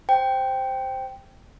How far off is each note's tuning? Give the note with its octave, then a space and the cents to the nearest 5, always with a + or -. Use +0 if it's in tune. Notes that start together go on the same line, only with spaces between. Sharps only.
C5 +0 G5 +0